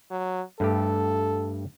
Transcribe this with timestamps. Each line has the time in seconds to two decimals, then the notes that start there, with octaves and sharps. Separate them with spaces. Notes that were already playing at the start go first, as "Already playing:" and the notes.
0.11 F#3
0.60 G2 A3 G4 A4